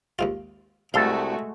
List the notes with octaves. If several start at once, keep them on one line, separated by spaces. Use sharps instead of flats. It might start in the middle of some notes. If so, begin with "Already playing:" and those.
D#2 G#2 F4
C2 G#3 A3 F#4 A4 F5 A5 C6